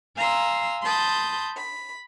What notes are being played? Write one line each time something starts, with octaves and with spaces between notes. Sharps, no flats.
F5 G#5 A#5 C6 E6
A5 B5 C6 D#6 G6
B5